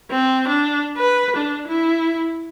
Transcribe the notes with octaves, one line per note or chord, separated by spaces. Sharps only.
C4
D4
B4
D4
E4